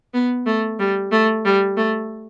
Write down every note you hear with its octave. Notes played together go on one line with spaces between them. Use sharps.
B3
A3
G3
A3
G3
A3